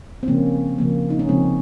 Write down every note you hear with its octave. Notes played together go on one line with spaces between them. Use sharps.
C4
C#3 F3 A#3 C#4
C#3 F3 A#3
D#4
C#4
C#3 F3 G#3 C4